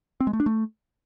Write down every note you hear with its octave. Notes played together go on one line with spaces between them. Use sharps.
C4
G#3
A3
D4
A3